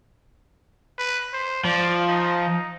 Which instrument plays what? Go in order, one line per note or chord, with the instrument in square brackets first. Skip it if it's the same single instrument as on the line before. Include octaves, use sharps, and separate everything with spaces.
[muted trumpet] B4
C5
[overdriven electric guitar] F3 [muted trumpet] D5
[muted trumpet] D#4